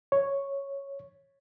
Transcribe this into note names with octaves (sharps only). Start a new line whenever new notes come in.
C#5